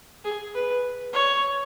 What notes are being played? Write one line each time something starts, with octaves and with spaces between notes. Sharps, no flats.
G#4
B4
C#5